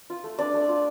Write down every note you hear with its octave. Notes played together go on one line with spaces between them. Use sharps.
F4
A3
D4 D5
A3
F4